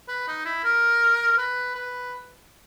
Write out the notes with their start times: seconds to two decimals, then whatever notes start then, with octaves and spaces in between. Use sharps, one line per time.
0.08 B4
0.28 D#4
0.45 E4
0.64 A#4
1.38 B4
1.75 B4